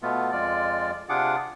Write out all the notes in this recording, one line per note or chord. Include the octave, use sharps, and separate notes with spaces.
B2 A3 B3 F4
F2 G#3 F4 D5
C3 D4 F4 G#4 F#5 D6